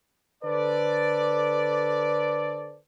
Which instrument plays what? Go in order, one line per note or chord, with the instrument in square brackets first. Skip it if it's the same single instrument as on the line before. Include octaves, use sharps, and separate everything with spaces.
[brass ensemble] D3 A4 B4 C5 D5